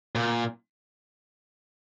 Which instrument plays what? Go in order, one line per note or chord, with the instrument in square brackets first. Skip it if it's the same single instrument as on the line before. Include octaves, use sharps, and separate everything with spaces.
[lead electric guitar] A#2